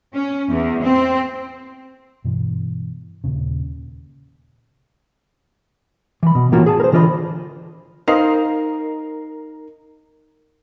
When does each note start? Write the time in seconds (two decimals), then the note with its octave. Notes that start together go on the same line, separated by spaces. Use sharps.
0.14 C#4
0.50 E2
0.84 C4
2.24 G2 B2 E3
3.24 D#2 A#2 C#3
6.23 E3 B5
6.35 B2
6.52 A2 E3 A#3 C#4 F4 F#4
6.66 G#4 G#5 A5
6.80 A#4 C5
6.92 D3 E3 F4 A#4 D#5 B5
8.08 D#4 A#4 C5 D#5 F5 C7 F7